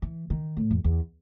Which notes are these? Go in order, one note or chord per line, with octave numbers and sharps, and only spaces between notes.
E3
D#3
A2
F2
E2